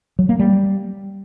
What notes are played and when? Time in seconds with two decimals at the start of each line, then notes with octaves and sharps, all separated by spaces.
0.19 F#3
0.29 A#3
0.39 G3